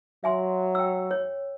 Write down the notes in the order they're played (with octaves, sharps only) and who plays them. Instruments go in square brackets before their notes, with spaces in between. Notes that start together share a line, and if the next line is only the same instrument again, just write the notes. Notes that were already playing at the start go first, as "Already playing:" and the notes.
[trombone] F#3 [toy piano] E5 G#5 C6
[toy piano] G5 E6
C#5